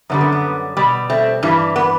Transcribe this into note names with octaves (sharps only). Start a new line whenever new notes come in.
F#2 D3 G3 B3
B3
B3
B2 G3
A3 C4
G2 E3 G3
B3